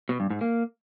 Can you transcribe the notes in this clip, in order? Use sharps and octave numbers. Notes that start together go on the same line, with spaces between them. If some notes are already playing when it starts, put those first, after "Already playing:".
B2
G2
G#2
A#3